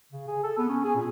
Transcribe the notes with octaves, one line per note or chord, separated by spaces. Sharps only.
C#3
G#4
A4
B3
C#4
G#4
A#2